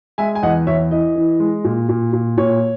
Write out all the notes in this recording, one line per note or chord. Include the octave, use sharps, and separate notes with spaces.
G#3 E5 G#5
G#5
E2 D#5 F#5
E2 C#5 E5
E3 D#5
E3
G#3
A#2
A#2
A#2
A#2 C#5